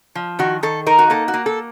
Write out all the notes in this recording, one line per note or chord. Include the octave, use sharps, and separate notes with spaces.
F3
D#3 F#4
D#3 A4
D#4 A#4
F#4
A#3 A4
F#4
A#3
A4